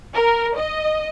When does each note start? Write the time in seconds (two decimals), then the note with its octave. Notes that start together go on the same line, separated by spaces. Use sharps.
0.15 A#4
0.57 D#5